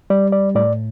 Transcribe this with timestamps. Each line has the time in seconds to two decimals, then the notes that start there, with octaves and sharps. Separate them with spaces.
0.10 G3 D5
0.32 D5
0.55 A2 D5